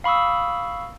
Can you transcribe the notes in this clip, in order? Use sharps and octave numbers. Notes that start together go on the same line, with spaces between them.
F5 B5 C#6 D#6 E6